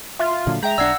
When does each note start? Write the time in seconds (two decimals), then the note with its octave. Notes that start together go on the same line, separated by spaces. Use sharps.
0.19 F4 E5
0.47 A#2 D3 F#3
0.63 G#3 E5 G5 A#5 G6
0.78 B1 D4 D5 F#5 E6 G#6 C7